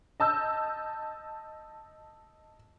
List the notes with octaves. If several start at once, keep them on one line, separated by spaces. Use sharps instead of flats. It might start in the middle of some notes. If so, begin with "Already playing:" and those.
D#5 A5 E6 G6